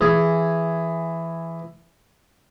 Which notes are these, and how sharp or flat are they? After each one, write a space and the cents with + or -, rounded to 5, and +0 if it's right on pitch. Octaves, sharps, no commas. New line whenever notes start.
E3 +10 G#4 +0